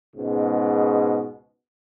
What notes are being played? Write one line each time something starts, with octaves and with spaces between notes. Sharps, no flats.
C#2 G#2 B2